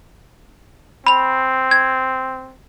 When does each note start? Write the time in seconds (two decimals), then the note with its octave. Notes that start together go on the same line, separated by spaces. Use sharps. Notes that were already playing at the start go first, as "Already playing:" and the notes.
1.07 C4 B5 F7
1.71 G#6